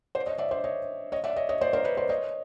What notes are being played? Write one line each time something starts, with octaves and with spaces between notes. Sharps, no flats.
C5 D5
C#5 D#5
D5 E5
C5 D5
C#5 D#5
C#5 D#5
D5 E5
C#5 D#5
C#5 D#5
C5 D5
A#4 C5
B4 C#5
C5 D5
C#5 D#5